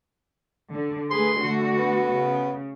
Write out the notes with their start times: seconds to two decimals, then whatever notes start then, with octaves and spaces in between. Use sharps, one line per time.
0.70 D3
1.11 A3 G#4 B4 C6
1.41 D3 A3 F#4
1.78 B3
2.14 C#3